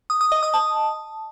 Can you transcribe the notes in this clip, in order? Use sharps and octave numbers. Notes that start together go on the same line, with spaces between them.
D#6
D#6
D#5
D#6
A5